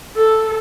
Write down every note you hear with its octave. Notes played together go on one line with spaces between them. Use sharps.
A4